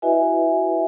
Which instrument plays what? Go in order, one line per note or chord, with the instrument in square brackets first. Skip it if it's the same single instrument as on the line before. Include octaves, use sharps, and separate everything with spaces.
[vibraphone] E4 F#4 B4 D#5 E5 G#5